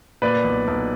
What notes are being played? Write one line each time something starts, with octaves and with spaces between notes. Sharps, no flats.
A#2 B4 D5
B1
B1